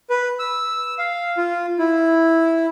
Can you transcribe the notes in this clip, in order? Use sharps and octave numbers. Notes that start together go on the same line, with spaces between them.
B4
E6
F5
F4
E4